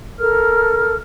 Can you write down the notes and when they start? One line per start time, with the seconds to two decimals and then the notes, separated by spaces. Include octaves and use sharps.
0.20 A4 A#4 F6